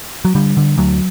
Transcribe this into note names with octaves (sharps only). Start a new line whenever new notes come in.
F#3
D3 G3
D3
D2 F#3